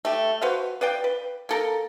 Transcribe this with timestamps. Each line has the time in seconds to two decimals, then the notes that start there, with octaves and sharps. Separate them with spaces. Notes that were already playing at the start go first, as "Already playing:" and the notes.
0.05 A3 G4
0.41 F#4 B4 C5 F5
0.81 B4 D5 F5 G5
1.04 B4
1.49 A#3 A4 A#4